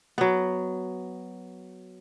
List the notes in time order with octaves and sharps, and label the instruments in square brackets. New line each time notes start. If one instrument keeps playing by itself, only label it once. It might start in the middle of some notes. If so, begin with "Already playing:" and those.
[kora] F#3 B3